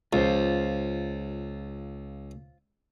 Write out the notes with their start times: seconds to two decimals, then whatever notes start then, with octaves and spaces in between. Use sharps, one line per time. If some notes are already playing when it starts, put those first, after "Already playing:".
0.13 C#2 F4 C5